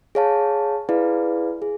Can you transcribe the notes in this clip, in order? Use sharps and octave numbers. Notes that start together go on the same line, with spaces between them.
G#4 C#5 F5 A5
E4 G#4 B4 D5 F5
G#4